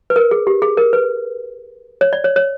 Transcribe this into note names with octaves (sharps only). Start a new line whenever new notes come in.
B4
A#4
G#4
G4
G#4
A#4
B4
C#5
D5
C#5
C#5